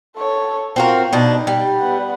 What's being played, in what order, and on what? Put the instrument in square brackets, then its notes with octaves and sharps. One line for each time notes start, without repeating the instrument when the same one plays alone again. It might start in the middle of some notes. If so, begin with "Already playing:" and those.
[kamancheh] A4 C#5
[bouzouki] C4 F#4 A#4 [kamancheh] F4
[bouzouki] B2 D4 [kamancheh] D#4
[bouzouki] G3
[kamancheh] B3 F#5